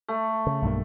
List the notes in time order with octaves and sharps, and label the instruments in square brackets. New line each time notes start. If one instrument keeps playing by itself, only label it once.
[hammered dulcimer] A3
[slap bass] C#3
B1 G2 A#3